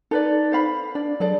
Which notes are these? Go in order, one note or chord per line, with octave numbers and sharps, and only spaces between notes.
D#4 A4 B4 D5
C5 F5 B5
D4 D5
F#3 G#4 A4 D5